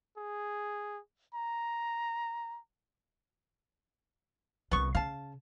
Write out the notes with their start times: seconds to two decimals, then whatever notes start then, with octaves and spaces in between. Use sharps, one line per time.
0.17 G#4
1.34 A#5
4.71 C2 D3 B3 C#6
4.95 C#3 F5 A5